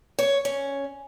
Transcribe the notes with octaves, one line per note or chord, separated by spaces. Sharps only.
C#5
C#4